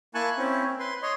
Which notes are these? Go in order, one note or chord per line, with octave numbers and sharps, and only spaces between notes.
A#3 E4 G#5 A5 C#6 F#6
C4 C#4 E4
B4 C6
C#5 D#5 C6